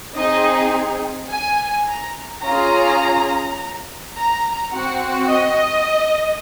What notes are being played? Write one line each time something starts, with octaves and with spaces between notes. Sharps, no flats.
C4 D#4 G#4 D#5
G#5
A#5
C#4 F4 G#4 A#5
A#5
C4 F#4 F#5
D#5